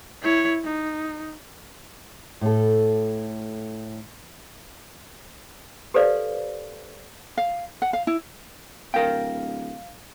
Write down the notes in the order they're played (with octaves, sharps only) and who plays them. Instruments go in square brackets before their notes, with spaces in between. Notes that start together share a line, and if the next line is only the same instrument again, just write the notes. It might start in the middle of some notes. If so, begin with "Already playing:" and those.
[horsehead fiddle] E4 C#5
D#4
[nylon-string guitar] A2 A4
[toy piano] G4 A4 B4 C5 D5 F5
[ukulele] F5
F#5
F5
E4
[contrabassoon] D1 [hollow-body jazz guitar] A#4 G5 [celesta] F5